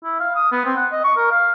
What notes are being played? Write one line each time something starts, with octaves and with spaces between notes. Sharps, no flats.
E4
F5
D#6
B3
C4
F#5
D#5
C#6
A#4
F5